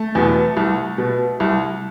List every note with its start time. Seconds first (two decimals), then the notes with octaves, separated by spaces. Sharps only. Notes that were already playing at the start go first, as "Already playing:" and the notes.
Already playing: A3
0.15 E2 B2
0.57 C2
0.98 B2
1.40 C2